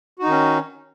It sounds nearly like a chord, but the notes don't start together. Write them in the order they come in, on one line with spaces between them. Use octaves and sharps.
F#4 D#4 D#3 C#4